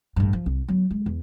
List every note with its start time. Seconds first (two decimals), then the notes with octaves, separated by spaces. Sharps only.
0.16 A1 G2
0.33 F3
0.46 C2
0.68 F#3 B3
0.91 G#3
1.06 E2